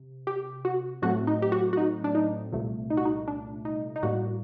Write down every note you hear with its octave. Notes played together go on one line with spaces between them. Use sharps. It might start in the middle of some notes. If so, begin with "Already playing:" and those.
Already playing: C3
G4
F#4
A2 F#3 A3 C4 F#4
D#4
G4
F#4
F#4
D#4
D4
D#4
C2 A#2 A3
D#4
F#4
D#4
D4
D#4
D#4
A2 G3 A#3 F#4